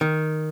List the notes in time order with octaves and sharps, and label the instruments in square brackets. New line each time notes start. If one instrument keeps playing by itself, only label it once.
[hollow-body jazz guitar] D#3